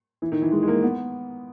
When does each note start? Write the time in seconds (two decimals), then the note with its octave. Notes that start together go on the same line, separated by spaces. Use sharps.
0.22 E3
0.32 D#3
0.42 E3
0.52 G#3
0.63 G#3
0.68 A#3
0.82 B3